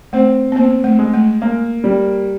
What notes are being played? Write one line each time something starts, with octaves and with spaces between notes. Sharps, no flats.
A3 C4
B3
A#3 C4
A3
G#3
A3
A#3
G3